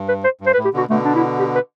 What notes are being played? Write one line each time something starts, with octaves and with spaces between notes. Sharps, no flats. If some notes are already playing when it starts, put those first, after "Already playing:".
Already playing: G2
B4
C5
G2
C5
B4
A2
G4
B2 D3 F#4
B2 D3 A3
D4
E4
G4
B4